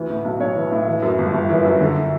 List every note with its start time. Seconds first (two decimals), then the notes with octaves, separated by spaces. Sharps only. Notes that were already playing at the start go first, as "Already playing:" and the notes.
Already playing: D2 E3
0.10 A2
0.25 B1
0.40 B1 C#5
0.56 E3
0.72 A2
0.87 E3
1.02 F#2
1.18 G1
1.34 G1
1.49 E3
1.65 F#2
1.81 D3